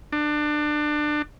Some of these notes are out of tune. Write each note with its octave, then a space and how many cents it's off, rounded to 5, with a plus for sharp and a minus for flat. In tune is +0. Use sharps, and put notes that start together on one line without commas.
D4 +25